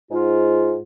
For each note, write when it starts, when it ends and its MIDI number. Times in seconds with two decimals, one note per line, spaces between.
0.11 0.79 44
0.11 0.79 65